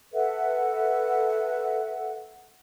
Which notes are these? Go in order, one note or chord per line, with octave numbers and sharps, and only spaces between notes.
A4 B4 E5 F#5